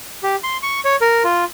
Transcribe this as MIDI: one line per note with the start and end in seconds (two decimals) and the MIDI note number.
0.23 0.36 67
0.44 0.57 84
0.63 0.80 85
0.85 0.96 73
1.01 1.23 70
1.24 1.44 65